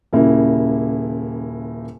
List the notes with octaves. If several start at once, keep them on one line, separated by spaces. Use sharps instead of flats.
D#1 C#3 A#3 E4